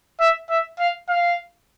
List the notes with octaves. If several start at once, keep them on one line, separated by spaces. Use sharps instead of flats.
E5
E5
F5
F5